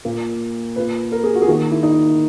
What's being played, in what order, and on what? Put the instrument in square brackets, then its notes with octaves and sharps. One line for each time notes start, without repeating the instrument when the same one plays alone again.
[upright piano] A#2 A#3
A#2 A#3 B4
A#4
G#4
F#4
G#4
D#3 A#3 F#4
E4
D#4